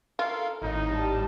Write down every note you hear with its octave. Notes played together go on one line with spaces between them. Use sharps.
F4 A4 A#4 F5
G#1 A2 D#4
G3 A5